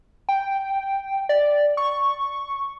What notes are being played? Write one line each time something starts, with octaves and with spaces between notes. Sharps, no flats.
G5
D5
C#6